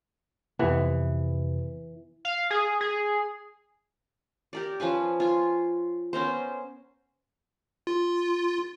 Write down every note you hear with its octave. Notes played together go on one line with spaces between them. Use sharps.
F2 C3 E3 B3
F5
G#4
G#4
G4 A#4 D5
F3 C#4 B4 G#5
F4 G#5
B3 C#4 A#4 C5
F4